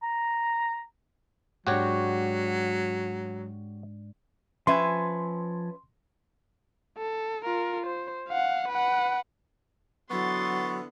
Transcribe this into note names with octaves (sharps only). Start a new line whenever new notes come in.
A#5
G#2 F#3 G#3 D4 F#4 G4 C#5
F3 C#4 B4 E5 G#5 C6
A4
F4 A#4
C5
F5 F#5
B4 F#5
D3 E3 F#3 B3 C6 C#6 A6